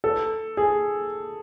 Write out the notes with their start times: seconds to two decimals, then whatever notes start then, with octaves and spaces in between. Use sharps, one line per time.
0.04 A4
0.57 G#4